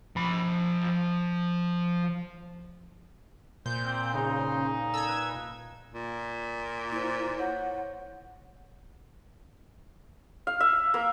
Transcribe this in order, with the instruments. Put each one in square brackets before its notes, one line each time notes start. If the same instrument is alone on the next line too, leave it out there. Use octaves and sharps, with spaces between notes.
[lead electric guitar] F3 B5
[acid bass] A#2 [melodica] C5 [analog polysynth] G6
[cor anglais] C4
[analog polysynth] C#3 [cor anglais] D#4
[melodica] A4 [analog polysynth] E6 G#6
[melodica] B4
[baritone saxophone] A#2
[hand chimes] A#3 C5 [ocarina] E4
[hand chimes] C#5 A#6 [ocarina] F#5
[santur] F5
E5
A#3